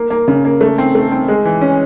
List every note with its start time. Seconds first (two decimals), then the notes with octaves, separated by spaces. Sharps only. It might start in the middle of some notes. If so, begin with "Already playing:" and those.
Already playing: A#3
0.10 A#3
0.28 C#3
0.45 A#3
0.61 A3
0.78 C4
0.95 A3
1.12 C4
1.28 G#3
1.45 E3
1.61 C#4